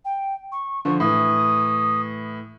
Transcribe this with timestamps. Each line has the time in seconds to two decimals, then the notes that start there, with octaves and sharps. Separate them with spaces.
0.05 G5
0.52 C#6
0.85 D3 F3 C#6
1.00 A2 E3 D#6